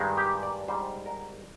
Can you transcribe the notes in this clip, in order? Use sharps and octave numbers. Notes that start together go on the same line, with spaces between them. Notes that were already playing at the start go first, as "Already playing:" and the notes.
Already playing: G2 D#3 G#3
G4
D5
G#2 G3 C5
A#4